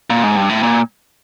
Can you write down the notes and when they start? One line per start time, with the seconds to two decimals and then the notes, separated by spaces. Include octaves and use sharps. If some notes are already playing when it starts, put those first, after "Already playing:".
0.10 A#2
0.24 G#2
0.36 G2
0.49 A2
0.63 A#2